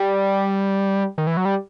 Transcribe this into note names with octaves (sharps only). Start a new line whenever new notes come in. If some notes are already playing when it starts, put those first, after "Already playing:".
Already playing: G3
D#3
E3
F#3
G3